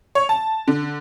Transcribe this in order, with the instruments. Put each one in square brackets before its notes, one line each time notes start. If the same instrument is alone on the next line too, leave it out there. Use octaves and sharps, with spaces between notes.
[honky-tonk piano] C#5
A5
D3